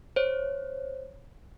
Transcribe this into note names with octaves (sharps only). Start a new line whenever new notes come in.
C5 C#5